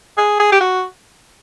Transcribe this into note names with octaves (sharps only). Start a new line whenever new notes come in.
G#4
G#4
G4
F#4